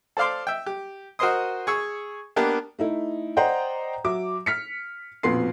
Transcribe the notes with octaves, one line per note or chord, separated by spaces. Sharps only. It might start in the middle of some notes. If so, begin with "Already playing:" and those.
A4 C5 D5 F5 C6 D6
E5 G5
G4
F#4 A#4 C5 D#5 C6 D#6
G#4 C#6 E6
A#3 B3 D4 G4 A#4
A3 D#4 E4
C5 D5 D#5 F#5 G5 A#5
F#3 E5 D6
F6 B6 C#7
A#1 F2 B2 B4 C6 C7